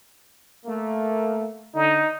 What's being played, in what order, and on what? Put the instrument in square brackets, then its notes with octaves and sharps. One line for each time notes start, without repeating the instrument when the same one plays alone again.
[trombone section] A3 A#3
[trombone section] D3 [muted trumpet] D#4